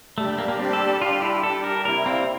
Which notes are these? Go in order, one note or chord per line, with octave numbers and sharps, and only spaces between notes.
G3 A3 D4 G4 D5
A3
A#3
A#3
G3 C4 D4 G4 D5
A4
A4
G3 D4 F4 G4 D5
E4
G3 D4 G4 A4 D5
A#4
C3 G3 A#3 E4 A#4
C4